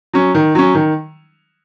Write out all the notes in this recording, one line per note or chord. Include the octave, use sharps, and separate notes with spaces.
F#3 C#4
D#3
F#3 C#4
D#3